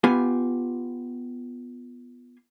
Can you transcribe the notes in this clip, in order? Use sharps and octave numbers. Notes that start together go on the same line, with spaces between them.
B3 F4 G4 G#5